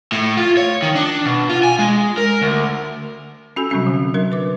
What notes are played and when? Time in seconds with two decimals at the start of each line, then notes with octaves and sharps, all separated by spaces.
0.12 A2
0.37 F4
0.57 C#5
0.82 D#3
0.96 D4
1.26 B2
1.49 F4
1.63 G#5
1.79 G#3
2.18 A#4
2.41 D2
3.56 C#4 F#4 A4 G#5 E6
3.70 C3 F#3 G3 C4 C#4 F#4
3.87 D3
4.14 F#3 D4 A#4
4.32 B4 D6